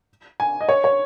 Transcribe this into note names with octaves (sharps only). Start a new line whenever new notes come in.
G#5
D#5
C#5
C#5